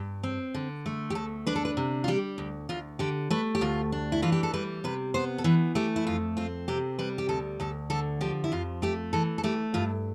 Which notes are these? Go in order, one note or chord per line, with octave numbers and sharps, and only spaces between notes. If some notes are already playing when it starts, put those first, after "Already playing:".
Already playing: G2
C4
D3
A3
G4
D2 A4
D4 B4
A4
B4
C3
F4
G3 G4
D2
D2 F4
D3 G4
A3 B4
G4
D2 F4
D4
E4
E3 F4
G4
A4
G3 B4
C3 B4
B3 C5
A4
E3 B4
A3 G4
E4
F2 F4
C4 F4
C3 G4
G3 B4
G4
D2 A4
D2 A4
D3 A4
F3 G4
E4
F2 F4
A3 G4
E3 A4
A4
A3 G4
G2 F4